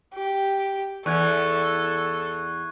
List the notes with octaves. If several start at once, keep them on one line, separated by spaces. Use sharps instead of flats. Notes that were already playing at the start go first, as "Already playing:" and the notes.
G4
E2 A4 C#6 F#6 G#6